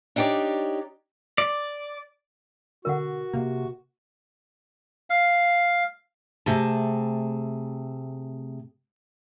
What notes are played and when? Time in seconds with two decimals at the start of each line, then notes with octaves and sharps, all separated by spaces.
0.16 D4 D#4 G4 C#5 D5
1.38 D5
2.85 B2 D3 F#4 A#4 F#5
3.33 C3 A#3
5.10 F5
6.46 C3 A3 G#4 A5